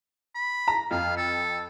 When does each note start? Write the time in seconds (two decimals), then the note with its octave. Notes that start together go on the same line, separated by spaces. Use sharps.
0.35 B5
0.68 A#5
0.91 F2 F5
1.17 A4